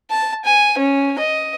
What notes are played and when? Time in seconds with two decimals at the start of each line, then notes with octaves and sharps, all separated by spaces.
0.11 A5
0.45 G#5
0.78 C#4
1.19 D#5